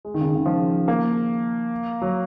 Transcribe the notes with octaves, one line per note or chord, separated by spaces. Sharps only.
G#3
D#3
C#3
D#3
C#3
F3
A#3
F#3